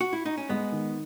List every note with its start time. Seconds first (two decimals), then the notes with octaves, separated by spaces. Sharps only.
0.01 F#4
0.13 E4
0.26 D#4
0.38 C#4
0.49 G#3 B3
0.72 D#3